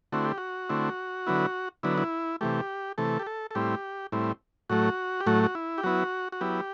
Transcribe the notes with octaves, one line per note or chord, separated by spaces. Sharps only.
D3 A3 C4 E4 F#4
G4
F#4
D3 A3 C4 E4
D3 F#3 B3 E4
D3 F#3 B3 E4
E4
C3 E3 A3 G4
C3 E3 A3 A4
G4
A4
A4
A2 G3 C4 E4 G4
A2 G3 C4 E4
A2 F#3 A3 F#4
G4
A2 F#3 A3 F#4
F#4
E4
G4
F#3 B3 E4 F#4
F#4
F#3 B3 E4 G4